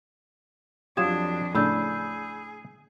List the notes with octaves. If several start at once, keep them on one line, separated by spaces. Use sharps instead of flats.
F2 F#3 D4 F4 G4 D#6 G#6 E7
A2 C#3 D4 G#4 B5 E6 G6